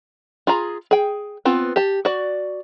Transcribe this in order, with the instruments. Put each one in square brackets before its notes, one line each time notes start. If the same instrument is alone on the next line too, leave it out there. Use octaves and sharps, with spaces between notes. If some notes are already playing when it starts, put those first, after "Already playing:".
[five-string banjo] F4 G#4 A#5
G#4 G5
B3 C4 F4
G4 A5
F#4 D5